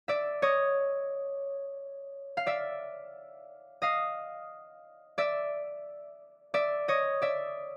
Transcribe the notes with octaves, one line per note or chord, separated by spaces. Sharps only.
D5 E5
C#5 D#5
F5
D5 E5
D#5 F5
D5 E5
D5 E5
C#5 D#5
D5 E5